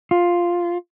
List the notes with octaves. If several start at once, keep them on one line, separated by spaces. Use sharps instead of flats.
F4